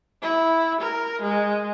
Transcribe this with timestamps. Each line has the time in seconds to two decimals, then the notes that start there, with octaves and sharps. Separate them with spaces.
0.22 E4
0.81 A#4
1.22 G#3